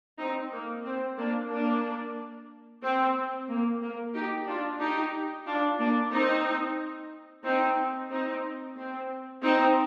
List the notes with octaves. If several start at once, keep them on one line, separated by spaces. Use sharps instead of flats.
C4 D#4
A#3
C4
A#3 D4
A#3 D4
C4
A#3
A#3
D#4 G4
D4 F4
D#4 G4
D4 F4
A#3 D4
C4 D#4
C4 D#4
C4 D#4
C4
C4 D#4